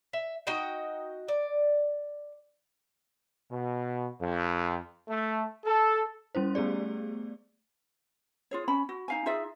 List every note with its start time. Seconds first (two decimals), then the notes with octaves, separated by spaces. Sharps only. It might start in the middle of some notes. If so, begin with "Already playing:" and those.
0.13 E5
0.47 D#4 F#4 D#5 G5
1.28 D5
3.51 B2
4.20 F2
5.08 A3
5.65 A4
6.35 G3 C#4 E4 C5
6.55 A3 B3 G4 G#4 D5
8.51 F4 G#4 C#5
8.68 C#4 B5
8.89 F#4
9.08 D#4 F5 G#5
9.26 D#4 F4 G#4 E5